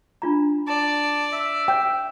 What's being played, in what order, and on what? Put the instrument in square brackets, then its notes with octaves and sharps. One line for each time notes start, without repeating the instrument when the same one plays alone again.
[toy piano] D4 F4 A#5
[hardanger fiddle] D5 [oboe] A5
[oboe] E5
[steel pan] G5